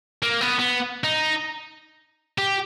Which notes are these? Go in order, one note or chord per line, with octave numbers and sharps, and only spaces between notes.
A#3
B3
B3
D#4
G4